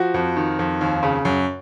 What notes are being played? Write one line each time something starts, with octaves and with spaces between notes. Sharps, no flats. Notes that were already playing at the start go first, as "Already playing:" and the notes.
Already playing: F3 F#4
F2
D#3
F2
D#2
C#3
F#2